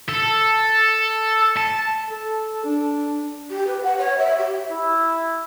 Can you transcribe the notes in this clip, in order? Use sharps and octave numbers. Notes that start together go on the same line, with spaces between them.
A4
A5
A4
D4
G4
B4
F#5
C#5
E5
G4
E4